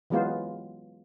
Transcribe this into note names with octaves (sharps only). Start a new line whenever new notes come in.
E3 F#3 G#3 B3 F4 C5